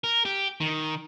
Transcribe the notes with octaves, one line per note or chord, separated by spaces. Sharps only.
A#4
G4
D#3